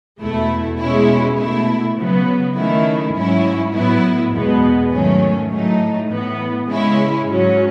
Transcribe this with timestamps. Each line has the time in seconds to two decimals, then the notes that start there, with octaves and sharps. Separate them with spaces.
0.21 E2 B2 A3 E4
0.80 B2 G#3 C#4 E4
1.38 B2 A3 E4
1.97 C#3 F#3 B3
2.56 D#3 A3 C#4 E4
3.15 G#2 F#3 C#4 E4
3.73 A2 F#3 B3 E4
4.32 E2 B2 G#3 B3
4.91 G#2 D#3 F#3 A3 C#4
5.50 A2 F#3 A3 D#4
6.09 A2 E3 B3
6.68 C#3 G#3 C#4 E4
7.26 G#2 F#3 C#4